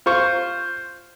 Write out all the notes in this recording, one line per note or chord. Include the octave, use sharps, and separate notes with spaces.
F4 C5 C#6